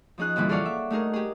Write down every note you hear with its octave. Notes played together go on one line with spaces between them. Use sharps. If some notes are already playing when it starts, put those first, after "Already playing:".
F3 C#4 D#4 G#4 F#6
F2 A#2 D3 E3 G3
G#4 A4 C#5 D5 F5 F#5
E5
A3 D#4 G#4 A#4
G4 G#4